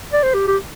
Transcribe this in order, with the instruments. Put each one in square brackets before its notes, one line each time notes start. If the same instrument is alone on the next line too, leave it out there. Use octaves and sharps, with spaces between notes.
[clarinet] D5
C5
G4
G4